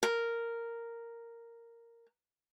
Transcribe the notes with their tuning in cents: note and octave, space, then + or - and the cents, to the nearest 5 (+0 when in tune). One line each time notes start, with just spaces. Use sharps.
A#4 -5